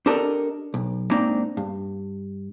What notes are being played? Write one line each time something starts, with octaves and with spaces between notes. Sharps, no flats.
D4 G4 A4 A#4 D5 D#5
B1
G#2 A#3 C4 D4 D#4 A#5
G2